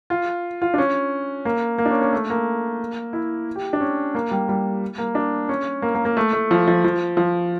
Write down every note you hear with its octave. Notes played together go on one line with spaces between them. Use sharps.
F4
F4
D4
C#4
A#3
A#3
D4
C#4
C#4
A3
A#3
E4
G4
D4
C#4
A#3
G3
G3
A#3
D4
C#4
A#3
A#3
A#3
A3
A3
F3
F3
F3
F3